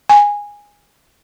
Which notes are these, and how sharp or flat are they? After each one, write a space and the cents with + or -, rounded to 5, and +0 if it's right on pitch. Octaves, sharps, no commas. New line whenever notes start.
G#5 -15